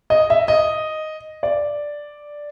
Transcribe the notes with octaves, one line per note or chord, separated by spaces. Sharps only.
D#5
E5
D#5
D5